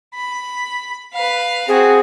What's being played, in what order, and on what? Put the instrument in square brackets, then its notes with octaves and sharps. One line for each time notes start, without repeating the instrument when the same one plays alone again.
[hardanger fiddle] B5
B4 F5
[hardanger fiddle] C4 F#4 [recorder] G#4